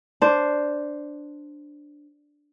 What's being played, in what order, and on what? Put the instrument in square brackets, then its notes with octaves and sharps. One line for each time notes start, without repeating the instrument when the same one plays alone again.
[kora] D4 C5